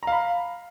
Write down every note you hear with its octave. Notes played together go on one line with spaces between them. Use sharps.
F5 A#5 B5